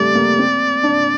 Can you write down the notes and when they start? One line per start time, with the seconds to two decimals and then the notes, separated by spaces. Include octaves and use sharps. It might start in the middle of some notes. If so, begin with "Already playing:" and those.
Already playing: G3 A3 C4 D5
0.15 A#3
0.39 C4
0.83 D4